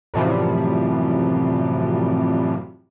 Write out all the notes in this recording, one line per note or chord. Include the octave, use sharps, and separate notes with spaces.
F#2 A2 C3 E3 F3 G3